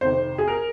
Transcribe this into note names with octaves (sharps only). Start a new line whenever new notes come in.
F2 C3 D#3 C5
G#4
A#4